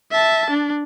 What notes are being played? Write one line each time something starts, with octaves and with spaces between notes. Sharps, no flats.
E5 A5
D4